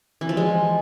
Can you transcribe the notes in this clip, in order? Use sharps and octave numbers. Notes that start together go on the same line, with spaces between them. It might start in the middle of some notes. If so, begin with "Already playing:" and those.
E3
F3
G#3